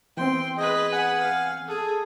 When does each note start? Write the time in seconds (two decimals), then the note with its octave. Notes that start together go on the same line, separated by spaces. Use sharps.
0.17 E3 B3 C4 G5 C6
0.57 G#4 B4 D#5
0.92 F#5 G#5
1.21 F5
1.68 G#4 A4